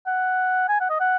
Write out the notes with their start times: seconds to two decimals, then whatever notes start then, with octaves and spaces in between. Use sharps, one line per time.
0.07 F#5
0.69 G#5
0.80 F#5
0.90 D#5
1.00 F#5